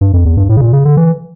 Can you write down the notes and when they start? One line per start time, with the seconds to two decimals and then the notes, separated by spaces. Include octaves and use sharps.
0.01 G2
0.13 F2
0.25 E2
0.37 G2
0.49 A2
0.57 C#3
0.61 A#2
0.73 C#3
0.85 D3
0.97 E3